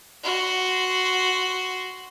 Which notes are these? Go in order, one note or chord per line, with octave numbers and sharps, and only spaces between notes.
F#4 C6